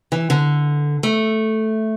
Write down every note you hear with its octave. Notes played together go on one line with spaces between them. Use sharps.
E3
D3
A3